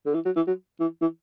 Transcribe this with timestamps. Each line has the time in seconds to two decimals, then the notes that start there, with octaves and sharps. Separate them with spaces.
0.05 D3
0.14 E3
0.25 F#3
0.36 E3
0.47 F#3
0.80 E3
1.01 E3